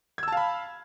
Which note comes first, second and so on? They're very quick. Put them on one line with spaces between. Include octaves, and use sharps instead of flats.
G#6 E6 A5 F5 B5